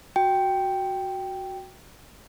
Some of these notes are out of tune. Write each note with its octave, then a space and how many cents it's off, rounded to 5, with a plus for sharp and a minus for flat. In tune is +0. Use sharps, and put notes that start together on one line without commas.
F#4 +0 G5 +0